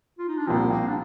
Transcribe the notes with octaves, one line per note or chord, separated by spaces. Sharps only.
F4
D#4
D4
C2 A#2 F3 C4
A#3
D4